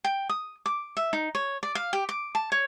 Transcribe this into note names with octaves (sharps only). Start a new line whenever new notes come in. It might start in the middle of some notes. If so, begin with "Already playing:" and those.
G5
D#6
D6
E5
D#4
C#5
D5
F5
G4
D6
A5
C#5